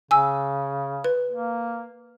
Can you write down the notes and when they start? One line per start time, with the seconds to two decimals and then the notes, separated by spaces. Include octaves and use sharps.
0.11 C#3 G#5 E6
1.04 B4
1.31 A#3